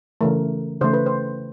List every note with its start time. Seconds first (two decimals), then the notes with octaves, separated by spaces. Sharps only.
0.21 C#3 E3 A3 A#4
0.81 C#3 E3 A3 C5
0.94 B4
1.06 C5